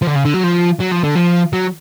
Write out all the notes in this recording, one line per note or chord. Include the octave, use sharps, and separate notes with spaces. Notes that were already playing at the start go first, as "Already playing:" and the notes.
F3
D3
C#3
D3
F#3
F3
F#3
F3
D3
F3
F#3